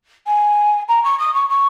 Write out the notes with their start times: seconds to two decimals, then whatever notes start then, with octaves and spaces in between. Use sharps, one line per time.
0.26 G#5
0.88 A#5
1.04 C#6
1.19 D#6
1.34 C#6
1.49 C#6